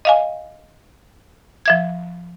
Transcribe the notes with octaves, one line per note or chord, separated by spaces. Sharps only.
D#5 F5 G#5
F3 E5 G#6